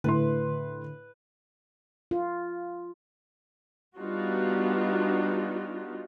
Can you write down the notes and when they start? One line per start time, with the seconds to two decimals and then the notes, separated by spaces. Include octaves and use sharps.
0.04 A2 D3 E4 B4 C6
2.11 F4
3.98 G3 B3 D4 D#4 F4 F#4